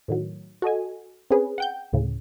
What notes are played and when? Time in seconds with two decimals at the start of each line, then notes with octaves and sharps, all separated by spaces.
0.08 A2 D#3 F#3
0.62 F#4 A4 D#5 G#5
1.30 C4 C#4 G#4 B4
1.58 F#5 G5 G6
1.93 D2 A2 C#3